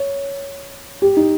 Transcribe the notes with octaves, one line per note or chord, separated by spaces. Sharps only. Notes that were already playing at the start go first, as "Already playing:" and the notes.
Already playing: C#5
G4
D#4